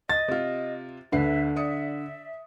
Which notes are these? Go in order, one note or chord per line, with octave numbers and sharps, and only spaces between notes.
D#5 A6
C3 F4
D2 D3 B4 E5 C7
D5 E5 D#6 C#7